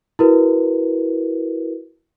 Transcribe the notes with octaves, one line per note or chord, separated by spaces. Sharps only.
E4 F#4 A#4 B4